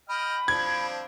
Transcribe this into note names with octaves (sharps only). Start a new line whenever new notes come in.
D#5 G5 B5 F6
F3 C4 D4 G#6